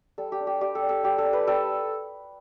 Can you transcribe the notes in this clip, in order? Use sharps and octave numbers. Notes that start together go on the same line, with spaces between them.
G3 A4
G4
D4
G4
G3 G4
A4
D4
A4
G3 G4
A4
D4
B4
G3 A4